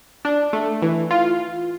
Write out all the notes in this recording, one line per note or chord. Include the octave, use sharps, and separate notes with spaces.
D4
A3
E3
F4